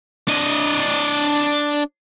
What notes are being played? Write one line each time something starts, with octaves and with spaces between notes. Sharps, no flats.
D4 D#5